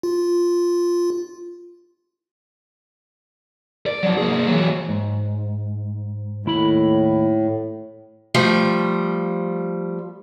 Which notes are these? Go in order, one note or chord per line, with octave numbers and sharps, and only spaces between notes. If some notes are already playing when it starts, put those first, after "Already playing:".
F4
D5
F3 F#3
A#3 G#4
E3 F#3
G#2
D#2 A2 E4 B5
F3 G3 A3